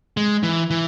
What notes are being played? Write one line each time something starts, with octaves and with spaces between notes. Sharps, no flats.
G#3
E3
E3